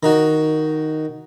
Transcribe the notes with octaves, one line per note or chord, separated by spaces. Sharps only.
D#3 D#4 F#4